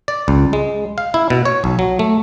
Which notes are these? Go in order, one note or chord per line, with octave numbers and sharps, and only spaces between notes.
D5
C#2
G#3
F5
E4
B2
C#5
B1
F#3
A3